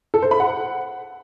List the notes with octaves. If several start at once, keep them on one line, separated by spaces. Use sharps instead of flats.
A4
C5
B5
F#5